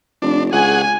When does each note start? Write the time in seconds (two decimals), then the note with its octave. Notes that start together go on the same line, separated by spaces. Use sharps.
0.22 F1 D4
0.53 C#2 G#4 F#5 G#5